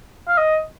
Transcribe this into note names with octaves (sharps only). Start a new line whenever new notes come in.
F5
D#5